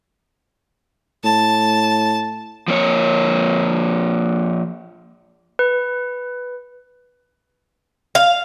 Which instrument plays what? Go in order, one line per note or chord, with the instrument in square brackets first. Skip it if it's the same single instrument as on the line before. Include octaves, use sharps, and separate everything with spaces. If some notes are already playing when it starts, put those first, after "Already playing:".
[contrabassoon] A2 [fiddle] A5
[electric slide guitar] F3 A#3 C#5
[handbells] B4
[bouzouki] F5